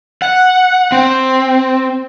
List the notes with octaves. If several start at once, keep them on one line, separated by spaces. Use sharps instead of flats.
F#5
C4